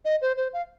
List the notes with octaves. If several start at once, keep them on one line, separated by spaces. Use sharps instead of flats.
D#5
C5
C5
F5